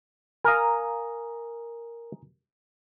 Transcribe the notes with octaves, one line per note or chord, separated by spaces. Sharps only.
A#4 F5 G#5 A#5 D#6